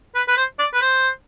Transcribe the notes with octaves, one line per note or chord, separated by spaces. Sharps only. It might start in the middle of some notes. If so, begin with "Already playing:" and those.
B4
B4
C5
D5
B4
C5